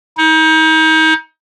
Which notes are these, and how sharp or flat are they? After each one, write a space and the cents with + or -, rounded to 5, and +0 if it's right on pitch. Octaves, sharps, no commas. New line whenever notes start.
D#4 +35